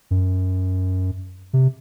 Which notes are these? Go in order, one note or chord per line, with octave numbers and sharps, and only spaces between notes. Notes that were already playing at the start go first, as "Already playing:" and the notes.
F#2
C3